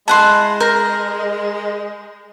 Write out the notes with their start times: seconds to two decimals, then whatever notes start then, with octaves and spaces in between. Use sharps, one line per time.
0.08 G#3 E4 F#5 A5 C6
0.60 A#4 G6 A#6